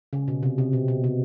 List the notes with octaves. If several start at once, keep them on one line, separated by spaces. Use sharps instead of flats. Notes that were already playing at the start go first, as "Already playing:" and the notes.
C#3
B2
C3
C3
B2
B2
C3